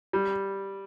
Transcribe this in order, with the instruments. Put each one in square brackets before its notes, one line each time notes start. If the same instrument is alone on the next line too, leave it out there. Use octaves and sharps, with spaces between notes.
[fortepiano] G3